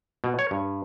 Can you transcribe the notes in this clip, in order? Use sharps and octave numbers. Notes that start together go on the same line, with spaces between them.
B2
C#5
G2